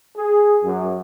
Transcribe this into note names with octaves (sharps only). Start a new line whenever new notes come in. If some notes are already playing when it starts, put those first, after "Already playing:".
G#4
F#2